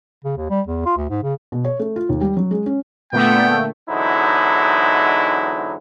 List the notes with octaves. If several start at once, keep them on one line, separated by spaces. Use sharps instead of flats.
C#3
D#2
G3
E2
F4
D2
G#2
C#3
B2
C#5
A3
F4
D#2
G3
F#3
G#3
C#4
A#2 D3 A3 B3 G5
E2 G#2 D3 F#3 D#4 E4